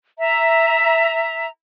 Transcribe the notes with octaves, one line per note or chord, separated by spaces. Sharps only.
E5 A#5